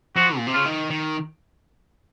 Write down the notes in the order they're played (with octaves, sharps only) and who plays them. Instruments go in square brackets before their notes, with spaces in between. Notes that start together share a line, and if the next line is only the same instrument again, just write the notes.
[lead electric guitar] F3 [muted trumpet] F#4
[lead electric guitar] A#2
C3
[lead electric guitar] C#3 [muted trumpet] F4
[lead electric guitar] D#3
D#3